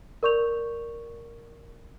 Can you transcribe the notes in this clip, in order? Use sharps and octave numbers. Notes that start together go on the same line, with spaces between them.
A#4 D5 C#6 G6 F7